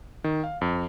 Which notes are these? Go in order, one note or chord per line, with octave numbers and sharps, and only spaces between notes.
D#3
F5
F2